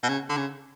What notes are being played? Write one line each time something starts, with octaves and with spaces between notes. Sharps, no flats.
B2
C#3
D3
C#3